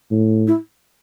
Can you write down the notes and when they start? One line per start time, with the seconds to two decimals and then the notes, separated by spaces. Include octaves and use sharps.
0.11 A2
0.47 E4